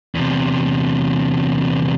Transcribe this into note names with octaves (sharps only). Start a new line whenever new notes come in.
E2 C3